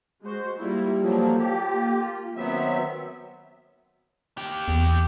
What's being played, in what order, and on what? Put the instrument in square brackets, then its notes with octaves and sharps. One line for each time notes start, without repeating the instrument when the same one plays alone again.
[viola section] G#3 F#4 C5
[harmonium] G3 [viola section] A#3 E4 F4
[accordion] F3 F#3 [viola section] A#3 A4
[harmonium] F4 [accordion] G4 [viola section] A4
[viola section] A#3
[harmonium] D#3 [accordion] F#3 B3 E5 [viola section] C4
[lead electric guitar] A#3 G4
[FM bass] E2